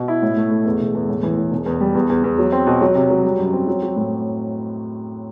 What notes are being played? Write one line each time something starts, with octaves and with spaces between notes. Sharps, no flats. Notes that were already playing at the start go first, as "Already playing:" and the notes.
Already playing: B2
E4
A2
A3
A3
E2
E1
E2
A2
E3
A2
E1
E2
G3
E2
E2
E2
F#3
C4
B2
F#3
C3
F#3
G3
F#2
C4
F#3
F#3
A2